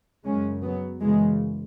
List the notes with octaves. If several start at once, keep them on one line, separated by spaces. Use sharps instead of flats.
F#2 C#3 G#3 C#4
F#3 B3
F#2 C#3 E3 G#3